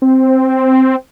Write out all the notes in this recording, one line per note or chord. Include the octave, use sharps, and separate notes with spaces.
C4